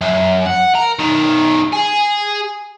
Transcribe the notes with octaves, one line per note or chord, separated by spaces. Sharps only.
F#2
F#5
A#4
B1 D#3
G#4